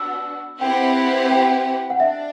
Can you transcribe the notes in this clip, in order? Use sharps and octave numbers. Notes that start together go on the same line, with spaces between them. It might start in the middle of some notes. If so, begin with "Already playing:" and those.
Already playing: B3 D4 F#4 E6
C4 E4 G4 B4 F#5 G5
G5
F#5
D4 E5